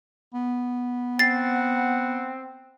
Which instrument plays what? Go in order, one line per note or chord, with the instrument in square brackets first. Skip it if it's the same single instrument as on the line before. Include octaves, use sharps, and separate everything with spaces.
[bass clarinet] B3
[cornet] C4 [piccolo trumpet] F#5 [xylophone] A6 C7